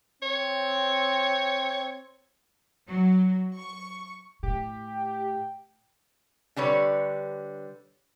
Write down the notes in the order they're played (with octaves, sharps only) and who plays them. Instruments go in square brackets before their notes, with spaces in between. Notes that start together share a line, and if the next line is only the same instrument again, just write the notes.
[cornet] C4 [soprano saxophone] C#5
[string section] F#3
C#6
[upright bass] A2 [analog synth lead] G4
[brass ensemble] G5
[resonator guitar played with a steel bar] D3 G3 B4 C#5